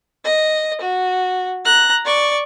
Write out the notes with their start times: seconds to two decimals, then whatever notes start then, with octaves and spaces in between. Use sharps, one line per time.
0.24 D#5
0.81 F#4
1.65 A#5 F#6
2.06 D5 C#6